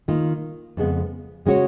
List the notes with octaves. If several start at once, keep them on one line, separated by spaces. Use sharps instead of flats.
D#3 A#3 F4
F2 C#3 G#3 B3
C#3 G#3 C#4 F#4 C#5